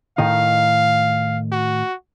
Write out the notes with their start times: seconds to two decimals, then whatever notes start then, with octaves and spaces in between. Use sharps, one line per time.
0.18 A2 D#3 D#4 F5
1.52 F#4